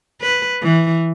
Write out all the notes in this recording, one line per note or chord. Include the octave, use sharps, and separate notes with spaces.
B4
E3